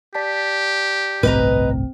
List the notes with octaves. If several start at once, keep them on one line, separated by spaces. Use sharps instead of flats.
G4 D5 A5 B6
G1 C2 A2 C4 B4 D#5 A#5